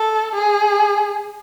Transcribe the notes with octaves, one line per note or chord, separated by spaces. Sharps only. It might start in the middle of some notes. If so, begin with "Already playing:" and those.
Already playing: A4
G#4